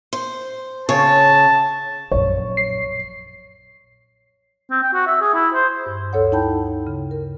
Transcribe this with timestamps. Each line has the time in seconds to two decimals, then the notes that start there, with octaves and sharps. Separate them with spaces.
0.13 C5
0.89 C#3 C#5 A5
2.12 A#1 F#2 C#5
2.57 C7
4.71 C4
4.82 G5
4.94 F#4
5.07 E5
5.21 G#4
5.34 E4
5.54 C5
5.86 G2
6.13 D2 A4 C#5 F#5
6.32 D#4 E4 G5 A5 B5 G6
6.87 C#3
7.11 A#4